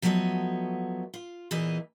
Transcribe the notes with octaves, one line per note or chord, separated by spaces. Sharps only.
F3 F#3 A3 B3 C#5 D#5
F4
E2 A#2 E3 G#4 D#5